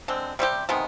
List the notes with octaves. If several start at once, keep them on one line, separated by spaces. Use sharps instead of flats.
D3 G#3 C4
C3 G3 C4 G4
C3 D#3 G#3 B3